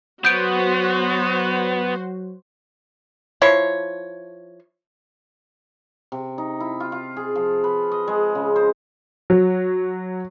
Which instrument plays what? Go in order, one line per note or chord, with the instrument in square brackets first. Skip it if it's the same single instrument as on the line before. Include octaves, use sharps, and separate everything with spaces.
[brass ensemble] F#3 [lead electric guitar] B3 [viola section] F#4 C5 [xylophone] G6 D7
[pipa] F3 E4 C#5
[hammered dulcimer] C3
D#4
E4
F4
F4
G#4
F3
B4
D#5
G#3
C#3
C5
[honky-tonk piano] F#3